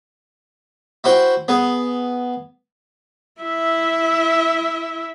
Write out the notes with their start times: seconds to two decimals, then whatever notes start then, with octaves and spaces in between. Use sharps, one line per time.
1.04 E4 F#4 C5 G5
1.48 B3 G#4
3.42 E4 E5